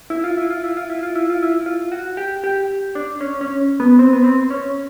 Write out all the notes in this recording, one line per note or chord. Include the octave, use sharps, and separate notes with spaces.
E4
F4
E4
F4
E4
F4
E4
F4
E4
F4
E4
F4
F#4
G4
G4
D4
C#4
C#4
B3
C4
B3
C4
C#4